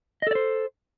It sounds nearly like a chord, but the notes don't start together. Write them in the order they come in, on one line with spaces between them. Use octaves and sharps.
D#5 A4 D5 C5